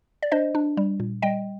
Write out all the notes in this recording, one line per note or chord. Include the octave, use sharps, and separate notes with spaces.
D5
D4 C5 D#5
D4
G3
A#2
G3 D#5 G5